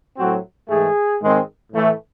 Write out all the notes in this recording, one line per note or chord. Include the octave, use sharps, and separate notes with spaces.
A2 F#3 C4 F#4
G#2 E3 A3 G#4
G#2 D#3 G#3 C4
A2 E3 A3